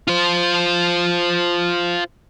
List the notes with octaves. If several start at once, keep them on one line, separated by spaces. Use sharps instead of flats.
F4 C5